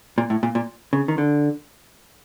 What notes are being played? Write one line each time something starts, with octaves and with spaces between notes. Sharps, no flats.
A#2
A2
A#2
A#2
C#3
D#3
D3